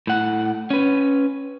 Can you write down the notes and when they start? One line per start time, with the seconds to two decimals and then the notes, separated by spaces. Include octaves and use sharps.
0.07 A2 F#5
0.70 C#4 B4